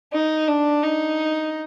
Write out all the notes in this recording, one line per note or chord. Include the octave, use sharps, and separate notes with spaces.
D#4
D4
D#4